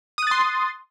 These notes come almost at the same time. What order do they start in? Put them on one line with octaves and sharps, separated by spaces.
D#6 F#6 A6 C6